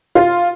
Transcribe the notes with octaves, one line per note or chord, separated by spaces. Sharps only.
F4